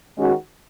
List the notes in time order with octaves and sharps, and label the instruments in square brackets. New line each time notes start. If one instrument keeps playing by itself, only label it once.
[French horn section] D#3 G#3 C#4 F#4